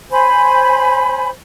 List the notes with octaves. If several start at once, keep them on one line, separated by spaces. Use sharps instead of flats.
C5 C#5 G#5 B5